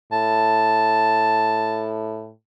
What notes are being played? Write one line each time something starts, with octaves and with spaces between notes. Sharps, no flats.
A2 A5